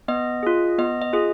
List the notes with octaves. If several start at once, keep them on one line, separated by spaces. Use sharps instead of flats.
B3 D#5
F4 G#4
B3 D#5
D#5
F4 G#4